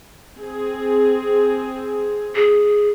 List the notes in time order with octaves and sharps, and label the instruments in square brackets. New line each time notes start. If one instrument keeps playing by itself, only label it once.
[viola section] C4 G#4
[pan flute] G#4